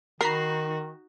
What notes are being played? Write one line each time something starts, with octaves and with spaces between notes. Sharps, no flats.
D#3 D#4 F#4 A#4 A#5 B5 C7